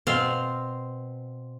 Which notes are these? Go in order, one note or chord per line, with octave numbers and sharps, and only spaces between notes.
B2 C4 F5